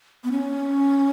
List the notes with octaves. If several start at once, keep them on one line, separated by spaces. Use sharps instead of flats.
B3
C#4